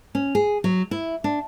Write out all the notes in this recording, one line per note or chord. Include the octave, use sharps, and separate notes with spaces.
C#4
G#4
F#3
E4
D4